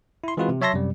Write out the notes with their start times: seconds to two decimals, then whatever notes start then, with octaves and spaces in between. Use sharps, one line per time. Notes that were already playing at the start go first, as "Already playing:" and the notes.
0.24 E4 C6
0.37 E3 G#3 C4 F4 F#4 B4
0.49 C3
0.61 F#3 C#5 E5 A5 C6 A#6
0.74 F#2 C3 G3